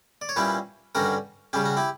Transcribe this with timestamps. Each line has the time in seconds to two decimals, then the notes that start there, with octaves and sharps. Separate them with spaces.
0.21 D5
0.29 C#5
0.36 A#2 G3 C#4 E4 G4 B4
0.95 G2 D3 G3 C#4 F#4 A#4
1.53 C#3 G3 C#4 G4
1.65 F#4
1.77 E4 G4